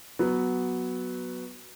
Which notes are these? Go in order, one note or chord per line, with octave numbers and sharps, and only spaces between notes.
F#3 B3